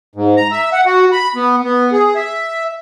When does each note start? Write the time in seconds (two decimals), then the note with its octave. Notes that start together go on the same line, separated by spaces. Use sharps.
0.16 G#2
0.37 A#5
0.51 E5
0.73 F#5
0.86 F#4
1.12 B5
1.36 B3
1.64 B3
1.92 G#4
2.15 E5